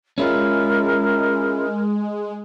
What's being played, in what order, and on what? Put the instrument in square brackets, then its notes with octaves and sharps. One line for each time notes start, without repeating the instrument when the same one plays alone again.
[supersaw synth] G#3 [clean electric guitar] C#4 E4 F4 [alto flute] A#4